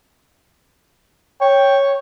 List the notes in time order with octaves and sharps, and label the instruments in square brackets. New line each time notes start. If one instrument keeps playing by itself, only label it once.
[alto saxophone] C#5 [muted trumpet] G5